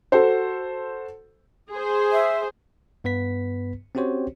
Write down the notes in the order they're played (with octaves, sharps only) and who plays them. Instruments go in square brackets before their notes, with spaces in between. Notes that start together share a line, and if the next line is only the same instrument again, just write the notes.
[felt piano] F#4 A4 C5
[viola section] G#4 C5
[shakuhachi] E5
[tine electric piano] G2 B3 B4 B6
C4 C#4 F#4 G4 C5 C#5